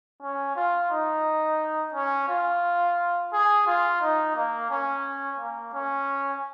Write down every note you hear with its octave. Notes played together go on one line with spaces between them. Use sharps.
C#4
F4
D#4
C#4
F4
G#4
F4
D#4
A#3
C#4
A#3
C#4